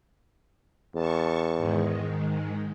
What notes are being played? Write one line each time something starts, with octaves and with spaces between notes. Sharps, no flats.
E2 A5 C#6
G#2 D#3 G#3